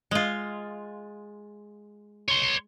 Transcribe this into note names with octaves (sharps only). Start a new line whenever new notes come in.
G#3 F4
C#5 C6